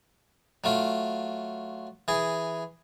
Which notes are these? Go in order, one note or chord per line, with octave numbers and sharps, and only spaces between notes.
F#3 A3 F4
E3 G#4